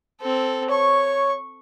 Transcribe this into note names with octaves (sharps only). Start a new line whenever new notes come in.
C4 A4
C#5 C#6